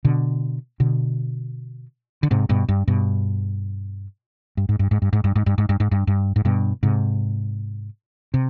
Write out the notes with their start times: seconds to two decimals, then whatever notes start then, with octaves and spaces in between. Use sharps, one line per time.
0.05 B2 D3
0.80 B2 D3
2.23 D3
2.31 G#2 C3
2.49 G2 B2
2.69 G2
2.88 G2 B2
4.57 G2
4.69 G#2
4.79 G2
4.91 G#2
5.02 G2
5.13 G#2
5.24 G2
5.36 G#2
5.46 G2
5.58 G#2
5.69 G2
5.80 G#2
5.91 G2
6.07 G2
6.36 G#2
6.45 G2 B2
6.83 G#2 C3
8.34 C3